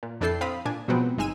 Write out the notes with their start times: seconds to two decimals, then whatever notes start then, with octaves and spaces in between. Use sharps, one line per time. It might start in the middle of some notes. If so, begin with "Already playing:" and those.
0.03 A#2
0.21 F2 D4 E4 A4 G5 C7
0.41 C4 F5 B5 D#6
0.65 A#2 D4 G#5
0.88 B2 F3 F#3 G#3 B3 C4
1.18 G1 G#3 D#4 G#5 E6 D#7